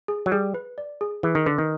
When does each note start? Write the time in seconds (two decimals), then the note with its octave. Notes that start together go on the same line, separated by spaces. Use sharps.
0.08 G#4
0.26 F#3
0.32 G3 G#4
0.54 B4
0.78 D5
1.01 G#4
1.23 E3 G#4
1.35 D#3
1.46 D3 B4
1.58 D#3